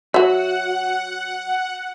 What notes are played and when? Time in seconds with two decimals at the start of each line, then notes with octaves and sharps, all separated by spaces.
0.14 F#3 F#4 E5 F#5